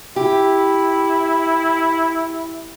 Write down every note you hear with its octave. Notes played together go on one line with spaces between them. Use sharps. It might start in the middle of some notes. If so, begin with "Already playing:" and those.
E4 G4